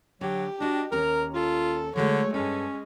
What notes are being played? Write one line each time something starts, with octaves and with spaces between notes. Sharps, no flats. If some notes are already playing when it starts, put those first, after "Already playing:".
D3 F#3 G4
D4 F#4 D#5
D#2 C#4 A#4 A#5
F4 A4
D3 F#3 G#3 A3 C#5
G2 G#3 C#4 A4